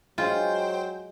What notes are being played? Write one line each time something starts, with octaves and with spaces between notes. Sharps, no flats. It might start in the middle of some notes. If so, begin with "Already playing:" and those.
F#3 G#3 F4 C5 G5